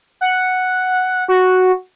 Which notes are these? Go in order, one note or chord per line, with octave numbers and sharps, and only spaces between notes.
F#5
F#4